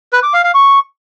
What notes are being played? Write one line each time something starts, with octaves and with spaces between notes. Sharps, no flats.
B4
D6
F5
F5
C#6